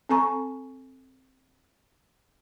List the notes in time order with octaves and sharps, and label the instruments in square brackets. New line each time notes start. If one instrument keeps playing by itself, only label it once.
[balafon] C4 A4 G#5 A#5 C#6